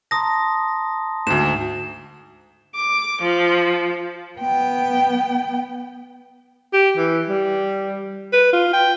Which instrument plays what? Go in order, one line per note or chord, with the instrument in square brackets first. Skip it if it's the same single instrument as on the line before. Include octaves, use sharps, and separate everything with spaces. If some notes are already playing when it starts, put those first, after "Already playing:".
[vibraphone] A5 A#5 C6 [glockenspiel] D#6 A#6
[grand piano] D2 G#2 [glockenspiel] E7
[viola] D6
F3
[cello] B3 G5
[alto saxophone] G4
E3
G3
B4
F4
G5